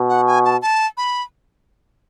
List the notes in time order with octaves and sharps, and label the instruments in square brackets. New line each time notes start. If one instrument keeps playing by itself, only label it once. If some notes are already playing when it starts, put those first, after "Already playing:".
Already playing: [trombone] B2
[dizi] F#5
G#5
A5
A5
B5